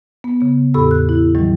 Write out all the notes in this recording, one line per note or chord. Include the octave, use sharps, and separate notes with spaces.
B3
C#3 B3
E2 A2 G4 A4 B5 E6
F#6
E4
A2 D#3 E3 F#3 G3